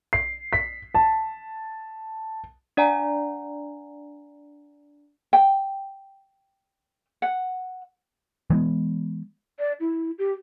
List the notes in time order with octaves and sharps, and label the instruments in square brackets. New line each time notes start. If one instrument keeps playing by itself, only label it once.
[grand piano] C7
B6
A5
[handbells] D4 D5 F#5 G#5 A#5
[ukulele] G5
F#5
[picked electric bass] E3 G#3 A#3 B3
[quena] D5
E4
G4